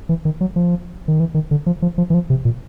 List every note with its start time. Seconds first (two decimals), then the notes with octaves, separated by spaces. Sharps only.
0.09 E3
0.25 D#3
0.41 F#3
0.56 F3
1.08 D#3
1.20 E3
1.34 D#3
1.51 D3
1.66 F3
1.82 F3
1.98 F3
2.10 E3
2.14 F3
2.30 C3
2.45 A#2